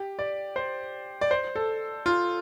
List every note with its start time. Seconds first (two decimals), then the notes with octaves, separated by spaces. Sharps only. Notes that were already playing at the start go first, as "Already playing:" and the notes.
Already playing: G4
0.19 D5
0.56 C5
1.21 D5
1.31 C5
1.56 A4
2.06 F4